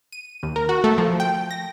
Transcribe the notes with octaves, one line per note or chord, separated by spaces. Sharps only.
D#7
D#2
A#4
F#4
A3
F3
G5
A#6